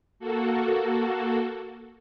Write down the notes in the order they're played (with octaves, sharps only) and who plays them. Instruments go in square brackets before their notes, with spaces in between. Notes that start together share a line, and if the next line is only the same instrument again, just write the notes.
[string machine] A#3 F#4 A4